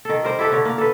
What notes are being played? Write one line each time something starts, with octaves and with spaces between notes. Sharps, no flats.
D#3 A4
G3 A#4 C5
E4 G4 A4 B4
D3 C#5
A#3
A4 B4